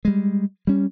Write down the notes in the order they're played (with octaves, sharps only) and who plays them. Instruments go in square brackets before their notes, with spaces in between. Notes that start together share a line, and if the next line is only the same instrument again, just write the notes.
[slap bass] G3 G#3
G3 C#4